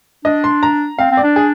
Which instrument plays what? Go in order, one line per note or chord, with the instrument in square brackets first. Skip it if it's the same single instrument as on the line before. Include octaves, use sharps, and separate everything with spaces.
[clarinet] D4 [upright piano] D#5
[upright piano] C6
A#5
[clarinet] C4 [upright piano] F5
[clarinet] C4
[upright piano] D5
[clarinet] D4
[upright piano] G#4